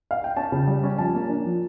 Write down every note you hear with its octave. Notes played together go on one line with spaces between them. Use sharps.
F5
G5
C#4 A5
C#3
G3
C#4
F3 A5
A#3
D4
F3